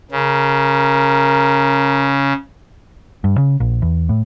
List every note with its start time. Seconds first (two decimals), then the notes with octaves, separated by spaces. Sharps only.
0.11 C#3 A#4
3.24 G2
3.38 C#3
3.60 A#1
3.82 E2
4.09 A2